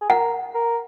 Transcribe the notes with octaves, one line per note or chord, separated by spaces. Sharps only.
G#4
A#4 F#5
A#4